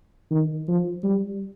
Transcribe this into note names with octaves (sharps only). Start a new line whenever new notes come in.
D#3
F3
G3